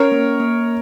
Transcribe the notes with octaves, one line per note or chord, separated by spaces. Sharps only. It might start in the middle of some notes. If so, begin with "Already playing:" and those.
Already playing: C#4 A#4 C#5
A#3
A#3